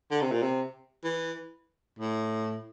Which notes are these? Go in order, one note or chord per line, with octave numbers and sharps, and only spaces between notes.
D3
C3
A#2
C3
E3
A2